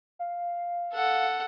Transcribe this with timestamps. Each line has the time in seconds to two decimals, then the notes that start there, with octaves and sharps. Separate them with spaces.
0.19 F5
0.94 A4 F#5